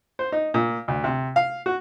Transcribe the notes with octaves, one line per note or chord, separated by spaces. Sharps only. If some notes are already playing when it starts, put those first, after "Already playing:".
C5
D#4
A#2
D2
C3
F5
F#4